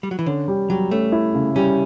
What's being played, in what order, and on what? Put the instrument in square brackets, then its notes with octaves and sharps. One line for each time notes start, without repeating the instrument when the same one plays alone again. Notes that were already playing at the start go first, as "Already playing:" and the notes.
[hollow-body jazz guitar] G3
F#3
E3
[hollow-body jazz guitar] D3 [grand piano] C#4
[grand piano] G3
[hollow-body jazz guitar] F#3 [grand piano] G3
[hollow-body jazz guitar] A3 [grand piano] C#4
[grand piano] E4
C#3
[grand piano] G3 [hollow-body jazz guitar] C#4